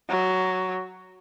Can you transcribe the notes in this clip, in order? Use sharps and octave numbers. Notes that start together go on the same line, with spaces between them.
F#3